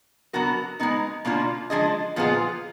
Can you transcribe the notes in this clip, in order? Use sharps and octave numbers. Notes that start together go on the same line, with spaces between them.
F#3 B3 D4 F#4 A#4
G#3 B3 D#4
B2 A#3 D4 F4
F3 G#3 D4 G#4 D#5
A#2 F3 B3 F4 G#4